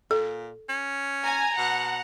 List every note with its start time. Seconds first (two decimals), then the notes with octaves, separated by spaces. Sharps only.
0.11 A#2 A4
0.69 C#4
1.24 G#5 A#5
1.58 B2 F#5